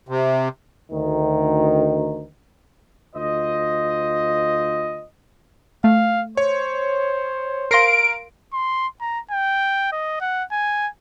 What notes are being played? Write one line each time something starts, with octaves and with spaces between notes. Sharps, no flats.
C3
D2 D#3
D2 F4 C5 D#5
A3 F5
C5 C#5
A#4 F5 C6 A#6 C7 D7
C6
A#5
G5
D#5
F#5
G#5